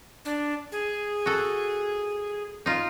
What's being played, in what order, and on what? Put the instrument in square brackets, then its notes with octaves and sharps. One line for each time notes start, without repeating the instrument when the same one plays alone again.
[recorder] D4
G#4
[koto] F#4 A4
D#4 F4